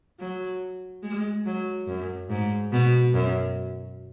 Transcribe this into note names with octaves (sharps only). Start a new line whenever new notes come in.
F#3
G#3
F#3
F#2
G#2
B2
F#2